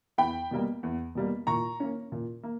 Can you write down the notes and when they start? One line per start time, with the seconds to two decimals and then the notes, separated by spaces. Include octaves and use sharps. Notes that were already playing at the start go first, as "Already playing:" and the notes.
0.18 E2 G5 B5
0.51 B2 G3 A#3
0.83 E2
1.15 B2 G3 A#3
1.47 A#2 A#5 C#6
1.80 A#3 C#4
2.12 A#2
2.43 A#3